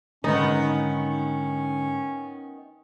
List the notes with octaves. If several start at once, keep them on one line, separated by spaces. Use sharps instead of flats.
G#2 D3 D#3 G#3 B3 C#4 D#4